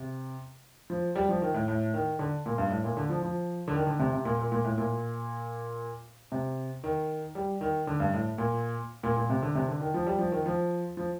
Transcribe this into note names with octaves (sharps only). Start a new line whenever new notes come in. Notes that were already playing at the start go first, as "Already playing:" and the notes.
Already playing: C3
F3
G3
F3
D#3
A2
A2
D#3
D3
A#2
G2
A2
A#2
D3
F3
F3
D3
D#3
D3
C3
C3
A#2
A#2
A#2
A2
A#2
C3
D#3
G3
D#3
D3
G2
A2
A#2
A#2
A#2
C3
D3
C3
D3
D#3
F3
G3
F3
D#3
F3
F3